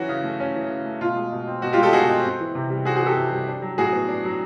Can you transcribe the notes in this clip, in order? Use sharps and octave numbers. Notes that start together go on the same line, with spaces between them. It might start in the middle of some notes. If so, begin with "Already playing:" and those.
Already playing: E3 F#3 C#4 F#4
C#3
A3
C#4
E3
C#3
A3
B2 F4
G#3
B2
C4
B2 F#4
F4 G4
G#3
G4 A4
B2 F#4 G#4
C4
C4
E3
C3
G3
C4 F#4 G#4
F#4 G#4
E3
G4 A4
C3
G3
D4
F#3
A2 F#4 G#4
B3
D4
F#3